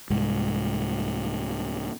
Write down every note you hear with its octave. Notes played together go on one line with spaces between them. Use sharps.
C2 G#2